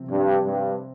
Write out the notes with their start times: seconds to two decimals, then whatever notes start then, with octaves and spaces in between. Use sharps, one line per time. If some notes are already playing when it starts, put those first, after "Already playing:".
Already playing: C3 F3 C4
0.10 G2
0.45 G2